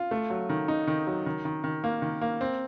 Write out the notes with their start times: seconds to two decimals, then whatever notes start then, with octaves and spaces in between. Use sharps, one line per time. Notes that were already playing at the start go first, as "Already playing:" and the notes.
Already playing: F4
0.11 A3
0.30 F#3
0.49 D#3
0.68 D#4
0.87 D#3
1.07 F#3
1.26 D#3
1.45 D#3
1.64 D#3
1.84 A#3
2.02 D#3
2.21 A#3
2.41 C4